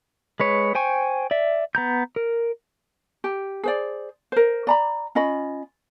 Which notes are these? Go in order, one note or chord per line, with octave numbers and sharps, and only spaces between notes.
G#3 B4 C#5
C5 G5 G#5 C#6
D5 E5
B3 A#5 G6
A#4
G4
G#4 C5 D5
A#4 C5
D5 A#5 B5
C#4 F4 D#5 B5